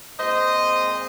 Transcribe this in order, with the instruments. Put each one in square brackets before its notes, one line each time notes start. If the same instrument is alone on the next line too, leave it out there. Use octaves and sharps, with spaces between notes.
[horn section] A#2 G#3 C4 C5 D#5